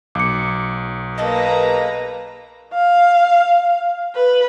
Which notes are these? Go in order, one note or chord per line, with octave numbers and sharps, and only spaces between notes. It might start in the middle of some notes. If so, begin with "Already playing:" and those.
B1 D6 C#7
A#3 G#4 A4 B4 D#5 A#5
F5
B4